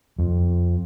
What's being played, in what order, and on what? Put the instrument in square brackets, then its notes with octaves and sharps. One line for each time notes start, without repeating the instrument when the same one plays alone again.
[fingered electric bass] F2